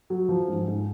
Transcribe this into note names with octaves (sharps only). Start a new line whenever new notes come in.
F#3
F3
G#2
G#2